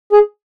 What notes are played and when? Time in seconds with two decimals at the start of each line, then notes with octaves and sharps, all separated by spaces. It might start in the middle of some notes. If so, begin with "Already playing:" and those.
0.13 G#4